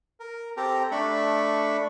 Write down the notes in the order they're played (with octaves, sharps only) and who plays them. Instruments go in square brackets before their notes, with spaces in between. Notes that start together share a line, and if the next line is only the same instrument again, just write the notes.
[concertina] A#4
C4 G4 A4 A#5
A3 D4 B5 C#6